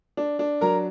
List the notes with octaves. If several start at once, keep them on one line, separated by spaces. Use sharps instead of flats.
D4
D4
F#3 A#4 A#5